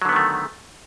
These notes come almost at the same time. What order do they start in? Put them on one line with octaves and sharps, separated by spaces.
F#3 D3 B3 D#3 A3